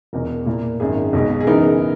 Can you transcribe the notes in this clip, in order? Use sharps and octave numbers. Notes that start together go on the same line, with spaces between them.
E1 E2 B2 A#4
A#2 A#3 E4
G#1 F#2 D#3 G#4
B1 B2 G#3
G#4
F#2 C#3 E3 B3 D#4 A#4